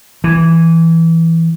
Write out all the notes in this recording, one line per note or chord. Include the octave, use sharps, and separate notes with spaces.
E3